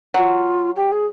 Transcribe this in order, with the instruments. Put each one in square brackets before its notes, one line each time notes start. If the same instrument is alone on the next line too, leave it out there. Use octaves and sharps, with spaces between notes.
[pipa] F#3 [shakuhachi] F#4
[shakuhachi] F4
G4
G#4